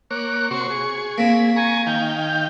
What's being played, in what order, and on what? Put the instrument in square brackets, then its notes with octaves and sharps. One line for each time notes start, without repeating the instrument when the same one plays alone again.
[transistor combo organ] A#3 C#5 D6 [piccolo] F#6
[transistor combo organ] C3 F#4 C6 [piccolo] C#6
[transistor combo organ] G#4
[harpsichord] A#3 C4 [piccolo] B6
[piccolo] G#5 [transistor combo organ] A#5 C#6
[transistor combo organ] D#3 F5 G5 [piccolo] G6